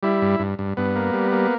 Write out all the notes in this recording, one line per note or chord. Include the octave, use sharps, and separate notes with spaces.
G3 E4
G2
G2
G2
G2 B3
A#3
G3
A#3